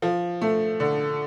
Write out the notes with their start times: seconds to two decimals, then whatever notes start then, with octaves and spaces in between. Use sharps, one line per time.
0.02 F3
0.41 A3
0.80 D3